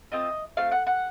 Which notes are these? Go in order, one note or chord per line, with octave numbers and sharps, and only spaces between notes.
A3 C4 F4 D#5
A3 C4 F4 F5
F#5
F#5